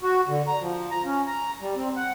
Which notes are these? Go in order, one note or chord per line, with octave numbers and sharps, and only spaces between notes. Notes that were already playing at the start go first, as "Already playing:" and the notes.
F#4
D3
A#5
F3
A#5
C#4
A#5
G3
C4
F#5